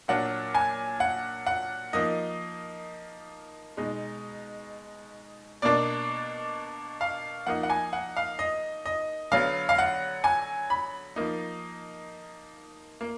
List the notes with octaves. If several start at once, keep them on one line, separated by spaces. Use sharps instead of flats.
A#2 F#3 D4 F#5
G#5
F#5
F#5
F3 A#3 D#4 D#5
B2 G#3 D#4
B2 A#3 D4 D5
F5
F3 A#3 D#4 F#5
F#5
G#5
F#5
F5
D#5
D#5
D3 F#3 B3 F5
F5
F#5
G#5
B5
F3 A#3 D#4
A#3